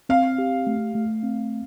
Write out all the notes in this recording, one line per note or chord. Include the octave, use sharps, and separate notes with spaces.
C4 F5
G4
A3
A3
C4